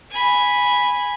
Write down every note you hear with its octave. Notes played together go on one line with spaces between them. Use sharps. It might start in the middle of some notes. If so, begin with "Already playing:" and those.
G#5 B5